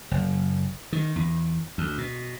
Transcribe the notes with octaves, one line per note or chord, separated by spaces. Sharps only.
F#1
D#3
E2
D2
B2